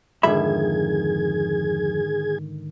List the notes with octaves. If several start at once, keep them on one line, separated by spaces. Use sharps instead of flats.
F2 G#2 D3 D#3 G#4 E5 B5 G#6